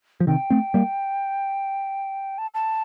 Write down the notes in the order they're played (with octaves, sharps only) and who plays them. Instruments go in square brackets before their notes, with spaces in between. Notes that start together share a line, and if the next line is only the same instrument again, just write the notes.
[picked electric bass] F3
[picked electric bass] C3 D#3 [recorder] G5
[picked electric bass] A3 C4
G3 A#3
[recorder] A5
A5